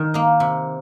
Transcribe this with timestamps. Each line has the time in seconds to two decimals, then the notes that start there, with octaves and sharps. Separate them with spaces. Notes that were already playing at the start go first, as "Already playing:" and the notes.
Already playing: D#3
0.14 A#3 D#4
0.40 C3